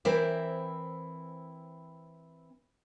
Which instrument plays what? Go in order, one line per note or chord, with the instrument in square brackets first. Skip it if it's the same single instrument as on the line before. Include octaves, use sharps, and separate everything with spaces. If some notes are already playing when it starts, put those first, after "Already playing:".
[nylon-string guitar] E3 C4 E4 A#4 C5 D5